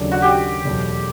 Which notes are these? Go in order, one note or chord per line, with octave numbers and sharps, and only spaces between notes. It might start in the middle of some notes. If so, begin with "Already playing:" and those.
Already playing: D#2 C#3 F#3 A3 D4
F#4
G4
E2 B2 F#3 A3